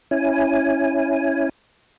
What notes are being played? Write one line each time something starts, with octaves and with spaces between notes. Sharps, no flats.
C#4 E4 G#5